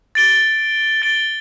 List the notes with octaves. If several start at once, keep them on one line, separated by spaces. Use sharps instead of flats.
A6 D7 G7
A6 D7 G7